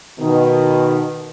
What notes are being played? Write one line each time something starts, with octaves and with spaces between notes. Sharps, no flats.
B2 D#3